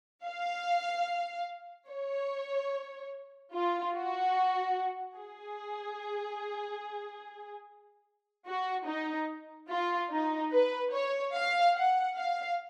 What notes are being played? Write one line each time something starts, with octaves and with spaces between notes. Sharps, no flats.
F5
C#5
F4
F#4
G#4
F#4
D#4
F4
D#4
B4
C#5
F5
F#5
F5